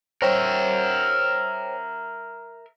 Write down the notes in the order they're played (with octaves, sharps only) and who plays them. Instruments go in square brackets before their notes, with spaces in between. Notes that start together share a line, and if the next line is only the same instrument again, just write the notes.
[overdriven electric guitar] A#4 E5 [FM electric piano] C5 C#5 G5